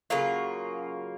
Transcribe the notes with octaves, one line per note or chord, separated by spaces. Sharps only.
C#3 F#3 A#3 F4